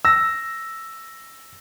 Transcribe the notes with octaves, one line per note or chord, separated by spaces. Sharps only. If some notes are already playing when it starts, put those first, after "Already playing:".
E6 A#6